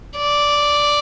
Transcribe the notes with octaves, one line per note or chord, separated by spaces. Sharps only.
D5